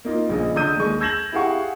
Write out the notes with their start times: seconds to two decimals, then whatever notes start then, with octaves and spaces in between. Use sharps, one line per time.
0.05 A#3 D#4 F4
0.30 A#1 C#3 D#5
0.56 D3 D5 D#6 E6 G6 D#7
0.76 D#2 G#3 C#6
1.00 E6 G6 G#6 A#6 E7 F#7
1.32 E4 G4 G#4 F5 F#5 C#6